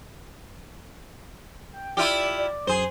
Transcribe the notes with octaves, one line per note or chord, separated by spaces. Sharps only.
G5
E4 F4 G4 D5
D5
F#2 G#4 C5